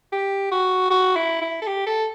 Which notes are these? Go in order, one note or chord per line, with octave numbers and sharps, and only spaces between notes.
G4
F#4
F#4
E4
E4
A4
G4
A4